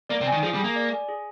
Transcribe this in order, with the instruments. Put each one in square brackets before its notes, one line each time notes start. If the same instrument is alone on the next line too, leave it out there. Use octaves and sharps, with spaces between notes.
[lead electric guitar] A#3 [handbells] D5
[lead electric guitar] C3
[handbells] G#5
[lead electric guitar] D#3
[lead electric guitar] F3 [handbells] G#4
[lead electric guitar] G3
[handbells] G#4
[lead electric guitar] A#3
[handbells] D5
G#5
G#4